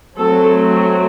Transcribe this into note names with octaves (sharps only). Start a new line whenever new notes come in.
F#3 A3 C4 A4